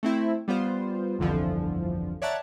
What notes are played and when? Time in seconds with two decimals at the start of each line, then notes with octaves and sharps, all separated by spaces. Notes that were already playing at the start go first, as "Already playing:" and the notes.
0.03 A3 C4 E4
0.48 G3 B3 F4 C5
1.19 G1 C2 F2 D3 E3 F3
2.22 C#5 D5 E5 F#5 A5 A#5